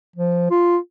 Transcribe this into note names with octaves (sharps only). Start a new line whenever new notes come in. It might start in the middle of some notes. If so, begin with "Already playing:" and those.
F3
F4